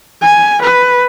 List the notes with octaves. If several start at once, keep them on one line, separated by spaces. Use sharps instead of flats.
G#5
B4